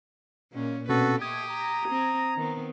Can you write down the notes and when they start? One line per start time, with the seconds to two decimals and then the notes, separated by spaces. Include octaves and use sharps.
0.52 A#2 F#3 G#3 A#3 C#4
0.89 C2 B2 D3 C4 C#4 F#4 A4 B4
1.21 B2 A3 G4 D#6 G#6
1.50 A#5
1.89 C4
2.36 D#3 B3 C4